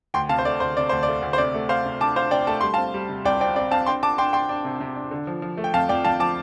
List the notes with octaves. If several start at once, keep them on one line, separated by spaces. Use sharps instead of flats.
D2 G5 C6
C3 F5 A5
C5
A3 D5
D2 C5
C3 D5
D2 C5
A3 D5
D2
C5
C3 D5
A3
C3 C5 F5
C3
D4 A5 D6
D4 C5 F5
C3 D5 G5
A3 A5
G3 C6
C4 F5 A5
G3
C3
C2 D5 G5
C4 D5 G5
C4 D5
C4 F5 A5
D4 G5 C6
D4 A5 D6
D4 G5 C6
D4 G5 C6
D4
C3
C3
D4
D3
F3
F3
A3
G5
F2 F5 A5
F2 D5 G5
F2 F5 A5
F3 A5 D6